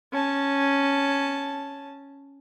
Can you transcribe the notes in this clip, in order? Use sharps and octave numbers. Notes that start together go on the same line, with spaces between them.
C#4 A5